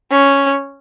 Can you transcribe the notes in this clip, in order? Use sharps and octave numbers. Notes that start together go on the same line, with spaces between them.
C#4